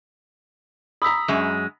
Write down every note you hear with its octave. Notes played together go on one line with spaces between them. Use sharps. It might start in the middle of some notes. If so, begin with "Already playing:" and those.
A#5 B5 D#6 E6 B6
F#2 G#3